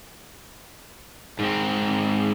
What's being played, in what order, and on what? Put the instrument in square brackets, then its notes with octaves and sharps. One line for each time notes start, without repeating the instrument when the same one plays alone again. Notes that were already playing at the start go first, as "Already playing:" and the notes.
[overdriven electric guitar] G#2 C4